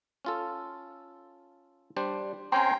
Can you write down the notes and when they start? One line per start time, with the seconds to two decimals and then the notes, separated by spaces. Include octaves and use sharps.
0.25 C#4 F4 A4
1.97 G3 D4 C5
2.52 C4 C#4 C5 G5 G#5 A#5 C6